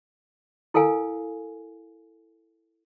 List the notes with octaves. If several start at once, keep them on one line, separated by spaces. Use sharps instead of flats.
E4 A4 A#4 F5 G#5